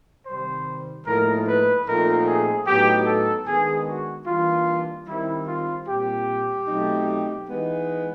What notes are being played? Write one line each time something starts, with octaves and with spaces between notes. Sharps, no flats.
C3 D#3 G3 C5
A2 F3 A#3 D#4 A#4
B4
A#2 F3 A3 C4 D#4 A#4
G#4
A2 F#3 B3 D#4 G4
A4
D#3 G#3 B3 D4 G#4
F#4
E3 G3 A#3 D4 F4
D#3 G3 C4 E4
F4
A#2 G3 C4 G4
B2 F#3 A3 C4 D#4
E3 G#3 B3 D#4